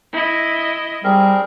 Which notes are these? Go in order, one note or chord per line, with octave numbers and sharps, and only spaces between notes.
E4 D#5
G3 C4 G#4 A#4